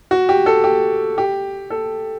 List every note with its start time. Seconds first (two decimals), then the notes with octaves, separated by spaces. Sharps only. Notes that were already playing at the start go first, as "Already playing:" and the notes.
0.11 F#4
0.29 G4
0.46 A4
0.64 G4
1.18 G4
1.70 A4